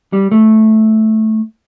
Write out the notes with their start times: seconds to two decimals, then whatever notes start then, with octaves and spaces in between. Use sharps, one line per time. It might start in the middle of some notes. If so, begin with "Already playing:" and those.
0.13 G3
0.32 A3